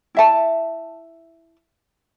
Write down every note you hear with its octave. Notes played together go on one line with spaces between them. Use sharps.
E4 E5 A5